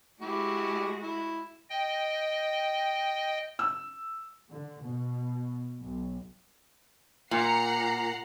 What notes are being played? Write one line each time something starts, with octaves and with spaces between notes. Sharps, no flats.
G#3 E4 F#4 G4
E4
D#5 G5
E6
D3
B2
B1
A#2 F#5 A#5 C7